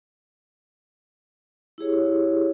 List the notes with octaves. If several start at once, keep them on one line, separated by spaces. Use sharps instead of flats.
E4 G4 G#4 C#5